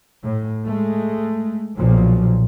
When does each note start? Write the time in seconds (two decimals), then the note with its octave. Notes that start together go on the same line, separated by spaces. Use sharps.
0.24 A2
0.65 G#3 A3
1.77 B1 A#2 F3